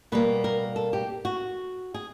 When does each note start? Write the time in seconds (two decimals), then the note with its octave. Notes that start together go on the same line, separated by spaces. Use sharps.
0.12 B2 G3 A#3 B4
0.44 A#4
0.76 A4
0.93 G4
1.25 F#4
1.94 G#4